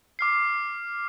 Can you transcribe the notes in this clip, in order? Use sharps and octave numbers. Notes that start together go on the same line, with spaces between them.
D6 F6 C7